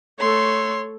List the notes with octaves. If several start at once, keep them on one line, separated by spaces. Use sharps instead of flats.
A3 A4 C#5 C6